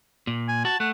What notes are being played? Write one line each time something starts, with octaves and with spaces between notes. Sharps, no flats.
A#2
G#5
F#4 A5
A3 F#5